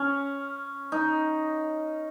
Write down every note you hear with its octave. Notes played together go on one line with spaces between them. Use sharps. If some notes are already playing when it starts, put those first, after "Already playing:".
Already playing: C#4
D#4